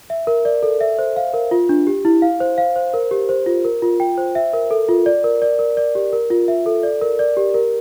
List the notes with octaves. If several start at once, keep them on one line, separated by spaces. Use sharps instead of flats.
E5
A#4
D5
A4
E5
C5
F5
A#4
F4
D4
G4
E4
F5
C5
F5
C5
A#4
G4
C5
F4
A#4
F4
G5
C5
E5
A#4
A4
F4
D5
A#4
D5
A#4
D5
G4
A#4
F4
E5
A4
D5
A#4
D5
G4
A#4